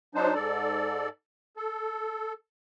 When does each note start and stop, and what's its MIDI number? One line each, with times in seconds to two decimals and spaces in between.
0.15 0.34 54
0.15 0.34 62
0.15 0.34 63
0.15 0.34 72
0.34 1.09 44
0.34 1.09 69
0.34 1.09 74
1.57 2.33 69